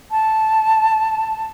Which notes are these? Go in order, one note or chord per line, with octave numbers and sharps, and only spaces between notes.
A5